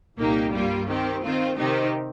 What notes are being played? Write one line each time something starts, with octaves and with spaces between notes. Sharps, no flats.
C2 A#2 A#3 D#4 G4
G2 G3 A#3 F4
D#3 C4 G4
D#3 C4 F4
C3 D#3 C4 D#4 G4